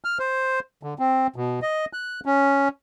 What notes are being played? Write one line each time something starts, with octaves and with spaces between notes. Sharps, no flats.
F6
C5
D3
C4
B2
D#5
F#6
C#4